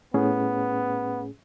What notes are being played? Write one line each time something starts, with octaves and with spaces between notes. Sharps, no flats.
A2 B3 C#4 G#4